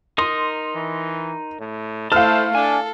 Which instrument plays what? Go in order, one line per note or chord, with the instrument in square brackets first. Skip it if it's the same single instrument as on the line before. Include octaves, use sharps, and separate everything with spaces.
[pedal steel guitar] D#4 A#4 D#6 [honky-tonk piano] C6
[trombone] E3
A2
[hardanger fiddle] A3 E4 [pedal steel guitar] A4 [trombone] C5 [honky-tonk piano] F5 F6
[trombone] D4 [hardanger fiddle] A4 [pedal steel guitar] G#5